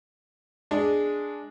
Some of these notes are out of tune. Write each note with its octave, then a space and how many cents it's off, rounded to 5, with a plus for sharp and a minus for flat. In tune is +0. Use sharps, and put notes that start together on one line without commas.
G#3 +0 D4 +0